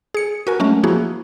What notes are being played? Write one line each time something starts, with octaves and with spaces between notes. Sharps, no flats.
G#4 C#7
F#4 A#4 G#5
F#3 G#3 A3 C#4
F3 A#3 E4 F#4 G#4